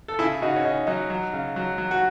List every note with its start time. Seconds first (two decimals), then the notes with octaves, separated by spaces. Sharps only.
0.08 A4
0.19 C#3 E4 G#4
0.42 C#3 D#4 F#4
0.56 C#4
0.64 C#3 D#4
0.87 F#3 D#4
1.10 F#3
1.33 C#3
1.56 F#3
1.78 F#3
1.91 F#4